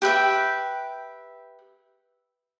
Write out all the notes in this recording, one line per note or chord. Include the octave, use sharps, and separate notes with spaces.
G4 B4 E5 G5